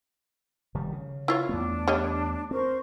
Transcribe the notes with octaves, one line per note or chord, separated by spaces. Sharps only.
F1 D#3 G3
C#3
E4 F4 C#5
E2 A3 B3 D4
G3 C#5 D#5
C4 A#4 C5 C#6